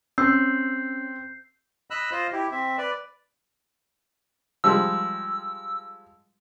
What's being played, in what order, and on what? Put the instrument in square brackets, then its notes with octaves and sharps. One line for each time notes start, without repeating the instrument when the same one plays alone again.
[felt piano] C4 [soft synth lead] C#4 [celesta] E6 [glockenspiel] G6 C7
[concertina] D#5 B5 E6 F#6
F4 C5 D#5
E4 G4
C4 E5
B4 D5
[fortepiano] F3 G3 G#3 [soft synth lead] E6